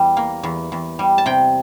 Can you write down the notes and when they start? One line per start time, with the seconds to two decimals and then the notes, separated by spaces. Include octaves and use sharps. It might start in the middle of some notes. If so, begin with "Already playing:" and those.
Already playing: E2 G3
0.17 A#3
0.43 E2
0.72 E2
0.99 G3
1.18 A5
1.26 C3 G5